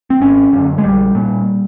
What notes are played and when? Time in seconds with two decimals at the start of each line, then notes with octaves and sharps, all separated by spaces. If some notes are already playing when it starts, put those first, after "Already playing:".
0.10 C4
0.20 G#1 C#4
0.53 F#2 D3
0.78 G#3
0.83 A#1 G3
1.15 A#2